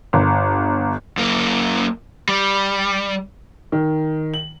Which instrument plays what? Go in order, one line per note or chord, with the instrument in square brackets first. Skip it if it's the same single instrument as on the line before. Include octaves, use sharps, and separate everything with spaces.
[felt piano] G1
[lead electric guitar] F#2 A#3
G3
[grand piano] D#3
F#7